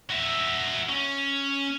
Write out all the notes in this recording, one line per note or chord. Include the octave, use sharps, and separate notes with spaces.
F#4 E5
C#4